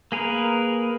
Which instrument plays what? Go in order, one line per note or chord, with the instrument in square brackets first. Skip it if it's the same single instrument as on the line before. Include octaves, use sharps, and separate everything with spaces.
[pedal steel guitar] A#3 G#4 A#4 B4